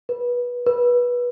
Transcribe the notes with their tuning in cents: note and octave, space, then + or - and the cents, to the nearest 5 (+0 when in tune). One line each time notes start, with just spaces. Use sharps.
B4 -20
B4 -20